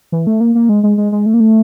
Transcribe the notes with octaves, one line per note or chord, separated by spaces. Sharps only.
E3
A3
A#3
A#3
G#3
G#3
G#3
G#3
A3
A#3
A3